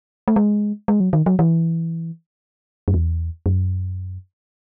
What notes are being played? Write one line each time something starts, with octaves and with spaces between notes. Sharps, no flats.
A3
G#3
G#3
F#3
D#3
F#3
E3
F#2
E2
F#2